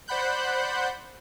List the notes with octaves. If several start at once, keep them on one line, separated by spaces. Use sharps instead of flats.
C5 D5 F#5 B5 F#6 G6